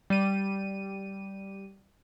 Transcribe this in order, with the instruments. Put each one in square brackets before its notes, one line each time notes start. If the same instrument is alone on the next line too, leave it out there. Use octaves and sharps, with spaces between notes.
[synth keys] G3 D#7